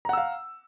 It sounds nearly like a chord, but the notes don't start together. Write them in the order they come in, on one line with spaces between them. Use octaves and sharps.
A#5 F#5 E6 F5